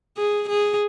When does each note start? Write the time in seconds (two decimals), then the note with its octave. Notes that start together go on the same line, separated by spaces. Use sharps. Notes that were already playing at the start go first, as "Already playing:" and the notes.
0.17 G#4
0.49 G#4